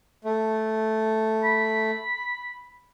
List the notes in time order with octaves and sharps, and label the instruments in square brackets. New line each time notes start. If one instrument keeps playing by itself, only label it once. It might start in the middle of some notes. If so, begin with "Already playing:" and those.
[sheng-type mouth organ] A3
[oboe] B5